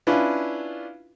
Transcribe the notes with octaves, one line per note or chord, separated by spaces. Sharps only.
C#4 D4 E4 F4 B4